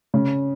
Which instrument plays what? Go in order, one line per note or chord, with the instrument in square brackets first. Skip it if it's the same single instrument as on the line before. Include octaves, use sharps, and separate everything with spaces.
[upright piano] C#3